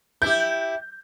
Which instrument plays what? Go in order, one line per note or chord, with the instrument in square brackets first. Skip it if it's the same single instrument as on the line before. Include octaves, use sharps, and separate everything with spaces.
[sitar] E4 G4 [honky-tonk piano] G6